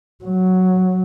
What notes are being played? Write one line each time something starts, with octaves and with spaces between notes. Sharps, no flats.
F#3